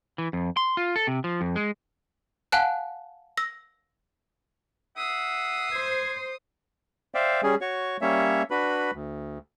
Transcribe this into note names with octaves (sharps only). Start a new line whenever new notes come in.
E3
F2
C6
F4
A4
C3
F3
F2
G#3
F5 F#5 G#5 A5 F#6
E6 A#6
E5 F#5 D#6 C7
C5 G#6
C5 D5 E5 F5 G5
G3 C#4 G#4
F#4 C#5 C#6
G3 A#3 C#4 C#5 E5
D4 F#4 B4 B5
D2